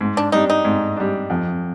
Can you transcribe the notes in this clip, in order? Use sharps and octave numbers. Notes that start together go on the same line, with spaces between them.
G#2
D4
G3 D4 D#4
D#4
G#2
G3 D4
F2